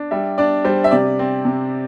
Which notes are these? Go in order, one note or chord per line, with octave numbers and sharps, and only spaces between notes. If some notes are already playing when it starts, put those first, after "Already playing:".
Already playing: D4
G3 E5
D4 D5
G3 C5
E5
C3 D5
C4
C3